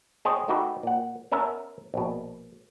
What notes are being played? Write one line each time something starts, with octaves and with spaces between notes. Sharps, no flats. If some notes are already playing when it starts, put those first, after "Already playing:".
B3 G#4 C5 C#5 D#5 G5
A3 D#4 F#4 G4 B4
A#2 F#5
B3 C#4 A#4 E5 A5
A#1 B2